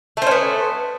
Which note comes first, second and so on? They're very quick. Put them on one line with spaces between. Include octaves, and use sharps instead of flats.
A3 C5 C#4 B3